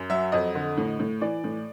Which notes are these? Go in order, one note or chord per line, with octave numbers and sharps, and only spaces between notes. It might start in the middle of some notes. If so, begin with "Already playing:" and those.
Already playing: F#2
F#3 E5
F2 D#5
D3
A2
A2
E3 D5
A2